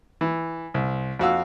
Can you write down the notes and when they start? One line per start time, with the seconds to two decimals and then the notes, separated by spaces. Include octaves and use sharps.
0.21 E3
0.74 C2
1.19 F2 F#4 F5 E6